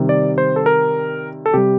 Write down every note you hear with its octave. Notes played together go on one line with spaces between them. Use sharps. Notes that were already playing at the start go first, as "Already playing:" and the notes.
Already playing: C3 D#3 G3
D5
C5
A4
A#4
A4
C3 G3 G4